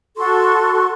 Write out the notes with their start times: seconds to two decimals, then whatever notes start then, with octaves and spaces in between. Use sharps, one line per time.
0.17 F#4 A4 C6 C#6